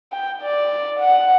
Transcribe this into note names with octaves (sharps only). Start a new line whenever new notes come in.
G5
D5
F#5